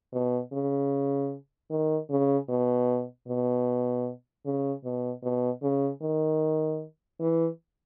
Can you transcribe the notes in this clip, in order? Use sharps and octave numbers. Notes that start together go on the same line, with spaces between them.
B2
C#3
D#3
C#3
B2
B2
C#3
B2
B2
C#3
D#3
E3